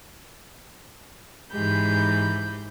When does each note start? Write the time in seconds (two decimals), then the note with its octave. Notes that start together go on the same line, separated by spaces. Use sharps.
1.52 G#2 E3 G4 B5 G6